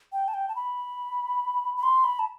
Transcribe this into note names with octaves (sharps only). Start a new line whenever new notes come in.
G5
A5
G5
A5
B5
B5
C6
B5
A5